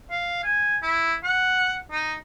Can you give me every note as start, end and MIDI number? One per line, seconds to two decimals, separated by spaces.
0.10 0.42 77
0.44 0.76 80
0.83 1.13 64
1.24 1.76 78
1.92 2.14 63